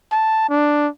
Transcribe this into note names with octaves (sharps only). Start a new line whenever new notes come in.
A5
D4